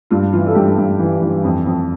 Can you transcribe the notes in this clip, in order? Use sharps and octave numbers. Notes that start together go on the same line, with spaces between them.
G2 F4
E3 F4
A4
G2 G4
G2
E3
E3
F2
F2